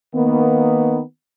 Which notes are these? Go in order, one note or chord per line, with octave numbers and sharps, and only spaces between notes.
D#3 A#3 B3